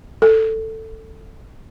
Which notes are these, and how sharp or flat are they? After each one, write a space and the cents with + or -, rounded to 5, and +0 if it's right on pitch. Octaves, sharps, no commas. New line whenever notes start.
A4 +10